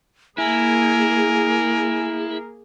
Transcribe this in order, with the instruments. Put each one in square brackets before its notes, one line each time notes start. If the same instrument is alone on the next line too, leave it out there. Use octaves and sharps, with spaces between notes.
[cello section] A#3 G#4 [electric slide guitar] E4 [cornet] A#4 [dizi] G#5